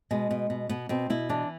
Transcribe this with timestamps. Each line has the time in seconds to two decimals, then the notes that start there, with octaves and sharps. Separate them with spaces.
0.11 B2 G#3
0.31 B2
0.50 B2
0.69 B2 B3
0.89 B2 C4
1.10 B2 E4
1.29 E3 D4